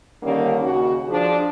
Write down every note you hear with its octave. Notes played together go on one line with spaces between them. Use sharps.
D3 D#3 G3 A#3 C#4
D#2 C#3 F#4
F3 D4 G#4